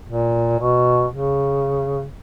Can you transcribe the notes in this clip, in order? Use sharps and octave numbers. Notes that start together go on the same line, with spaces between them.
A#2
B2
C#3